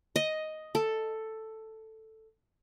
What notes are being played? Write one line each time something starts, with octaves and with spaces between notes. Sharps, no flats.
D#5
A4